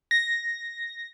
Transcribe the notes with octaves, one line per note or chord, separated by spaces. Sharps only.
A#6